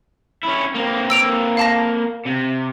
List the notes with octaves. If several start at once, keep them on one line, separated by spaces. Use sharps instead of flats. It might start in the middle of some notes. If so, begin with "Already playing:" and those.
C#4 E4
A#3 C4
E6 D7 F7
F5 A5 A#6
C3